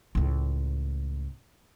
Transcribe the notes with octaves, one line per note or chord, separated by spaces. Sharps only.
C#2 A2